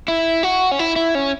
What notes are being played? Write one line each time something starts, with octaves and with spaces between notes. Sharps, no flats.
E4
F#4
C#4
E4
E4
C#4